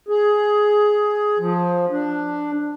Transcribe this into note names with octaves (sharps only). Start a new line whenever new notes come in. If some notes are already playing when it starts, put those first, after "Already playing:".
G#4
F3
D4